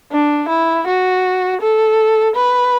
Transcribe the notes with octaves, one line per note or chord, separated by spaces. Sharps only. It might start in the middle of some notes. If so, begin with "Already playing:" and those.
D4
E4
F#4
A4
B4